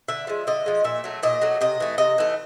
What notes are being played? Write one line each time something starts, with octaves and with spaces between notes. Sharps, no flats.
D3 E5
F3 G#3
D3 D#5
F3 G#3
A#2 E5
F#3 A3
A#2 D#5
F#3 A3
C3 D#5
E3 A3
C3 D#5
E3 A3